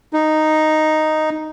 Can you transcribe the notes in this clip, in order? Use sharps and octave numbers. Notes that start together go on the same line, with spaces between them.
D#4